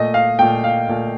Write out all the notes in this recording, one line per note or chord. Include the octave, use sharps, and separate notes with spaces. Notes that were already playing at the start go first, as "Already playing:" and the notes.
Already playing: A#2 A3 D#5
F5
A#2 A3 G5
F5
A#2 A3